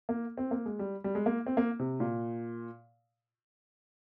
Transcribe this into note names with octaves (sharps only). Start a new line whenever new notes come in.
A#3
C4
A#3
G#3
G3
G3
G#3
A#3
C4
A#3
C3
A#2